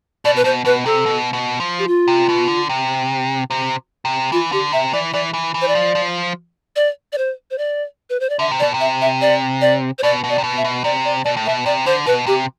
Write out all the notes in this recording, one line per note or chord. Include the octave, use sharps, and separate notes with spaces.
B2 D5
B4
B2 C5
B2 B4
C3 A4
B2
B2
F3
G4
F4
C3
B2
D3
C3
C3
C3
E3 F4
D3 G4
C3 E5
E3 D5
E3 D5
E3
E3
C5
D5
F3
F3
D5
D5
C5
C5
D5
B4
C5
D5
D3 E5
C3
D5
B2
C3
E5
E5
D5
D5
C5
B2 D5
B2
D5
C3
B2
E5
B2
C3 D5
D5
B2 D5
A2
E5
B2
C3 D5
D3 C5
B2 B4
C3 G4